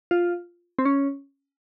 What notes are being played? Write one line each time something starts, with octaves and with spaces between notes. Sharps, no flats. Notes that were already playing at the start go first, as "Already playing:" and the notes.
F4
C4
C#4